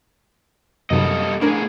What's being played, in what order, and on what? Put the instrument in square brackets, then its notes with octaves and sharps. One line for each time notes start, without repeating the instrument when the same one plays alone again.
[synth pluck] F#2 C3 D#3 [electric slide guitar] G3 A4 D#5
[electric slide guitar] A2 G#4 [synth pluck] D4 A#4